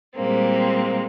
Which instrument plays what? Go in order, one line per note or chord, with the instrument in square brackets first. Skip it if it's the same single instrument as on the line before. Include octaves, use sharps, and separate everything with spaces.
[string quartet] A#2 G3 G#3 A#3 C4